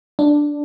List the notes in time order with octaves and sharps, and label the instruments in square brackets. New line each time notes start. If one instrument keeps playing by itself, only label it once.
[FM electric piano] D4